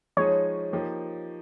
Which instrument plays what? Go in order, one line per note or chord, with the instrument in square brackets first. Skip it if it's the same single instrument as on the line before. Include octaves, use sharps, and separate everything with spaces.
[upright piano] F3 G#3 D#4 G#4 [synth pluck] C#5
[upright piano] F3 A#3 D#4 G4